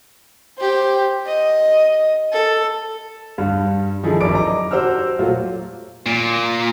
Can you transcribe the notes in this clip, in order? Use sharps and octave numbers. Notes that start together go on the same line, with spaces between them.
G4 C5
D#5
A4
G2 G3 F5
D#3 F3 D#4 E4 G#4 A4
G#1 F#2 E4 D5 D6 D7
D#5 A#5 D6
F#4 G4 C5 F#5 E6 F6
A#2 F#3 A3 F4
A#2